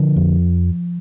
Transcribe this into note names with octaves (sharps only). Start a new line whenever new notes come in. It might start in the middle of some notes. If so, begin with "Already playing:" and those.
Already playing: D3 F3
F2